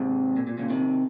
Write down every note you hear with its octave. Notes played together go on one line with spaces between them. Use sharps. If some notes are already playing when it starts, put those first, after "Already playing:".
Already playing: G#2 C3
A#2
A#2
A#2 C#3
C3 D#3